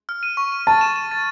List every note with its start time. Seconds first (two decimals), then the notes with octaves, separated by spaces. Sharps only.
0.09 F6
0.23 D#7
0.37 C#6
0.52 D#7
0.67 A5 A6
0.81 E7
0.96 E7
1.11 A6